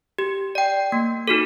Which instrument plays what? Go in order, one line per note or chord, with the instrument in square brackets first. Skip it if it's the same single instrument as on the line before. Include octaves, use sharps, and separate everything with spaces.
[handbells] G4
D5 G5
A#3
D#4 F#4 A4